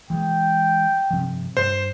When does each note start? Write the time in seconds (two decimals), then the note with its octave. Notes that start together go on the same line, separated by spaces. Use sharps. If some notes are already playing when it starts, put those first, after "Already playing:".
0.10 E3 G#3 G5
1.11 G2 C3 F3
1.57 G2 C5